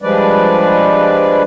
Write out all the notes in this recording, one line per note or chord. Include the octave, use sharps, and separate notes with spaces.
F3 G3 G#3 D4 B4 D5